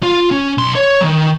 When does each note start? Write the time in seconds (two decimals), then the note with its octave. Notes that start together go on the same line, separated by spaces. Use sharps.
0.03 F4
0.31 C#4
0.58 B1 C6
0.75 C#5
1.01 D#3 F#3